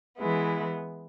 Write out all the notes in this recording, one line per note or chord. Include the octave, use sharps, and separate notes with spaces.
E3 G#3 B3 E4